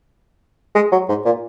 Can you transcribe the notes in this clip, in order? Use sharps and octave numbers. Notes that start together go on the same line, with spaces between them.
G#3
F#3
G#2
A#2